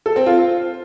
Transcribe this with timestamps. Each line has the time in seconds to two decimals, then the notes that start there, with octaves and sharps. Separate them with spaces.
0.06 A4
0.16 C4
0.26 F4